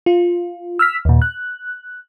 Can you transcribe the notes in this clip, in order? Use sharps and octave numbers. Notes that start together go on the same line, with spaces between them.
F4
E6 F6 B6
D#2 A#2
F#6